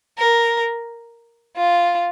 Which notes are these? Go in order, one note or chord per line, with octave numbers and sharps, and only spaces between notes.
A#4
F4